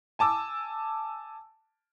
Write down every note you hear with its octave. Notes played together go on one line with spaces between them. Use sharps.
G#5 A5 D6 E6